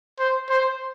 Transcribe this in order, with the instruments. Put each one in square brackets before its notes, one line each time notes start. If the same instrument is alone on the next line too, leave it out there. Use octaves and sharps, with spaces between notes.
[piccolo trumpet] C5
C5